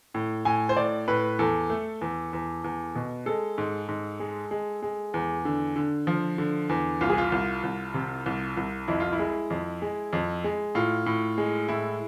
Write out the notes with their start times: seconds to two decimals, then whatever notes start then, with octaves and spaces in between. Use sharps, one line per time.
0.14 A2
0.45 A2 G#5
0.69 C5
0.77 A2 D5
1.08 A2 B4
1.39 E2 A4
1.70 A3
2.01 E2
2.33 E2
2.64 E2
2.95 B2
3.26 G#3 A4
3.58 G#2
3.89 G#2
4.20 G#3
4.51 G#3
4.82 G#3
5.14 E2
5.45 D3
5.76 D3
6.07 F3
6.38 D3
6.69 E2
7.01 C2 F4
7.09 G#4
7.18 F4
7.32 C2
7.63 C2
7.94 C3
8.26 C2
8.57 C2
8.88 F2 E4
9.00 F4
9.13 E4
9.19 G#3
9.50 F2
9.82 G#3
10.13 F2
10.44 G#3
10.75 A2 F4
11.06 A2
11.38 G#3
11.68 A2 E4